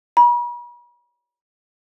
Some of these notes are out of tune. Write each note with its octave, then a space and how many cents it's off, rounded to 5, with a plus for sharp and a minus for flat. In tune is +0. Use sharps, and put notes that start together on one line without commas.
B5 -45